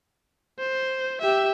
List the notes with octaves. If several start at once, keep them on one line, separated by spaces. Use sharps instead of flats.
C5
G4 E5